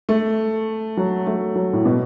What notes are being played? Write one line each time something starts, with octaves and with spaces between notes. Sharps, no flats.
A3
F#3
A3
F#3
A2
B2